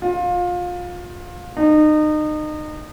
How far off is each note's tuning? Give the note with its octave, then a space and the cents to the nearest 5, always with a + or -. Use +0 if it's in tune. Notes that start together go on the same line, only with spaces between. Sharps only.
F4 +25
D#4 -30